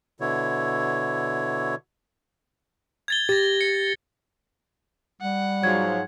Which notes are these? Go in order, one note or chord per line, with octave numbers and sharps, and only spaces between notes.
B2 D3 E4 C#5
G#6 A6 G7
G4 A6 A#6
C#7
G3 F#5
G#2 F3 F#3 G#6